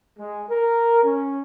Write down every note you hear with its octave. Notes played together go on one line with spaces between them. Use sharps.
G#3
A#4
C#4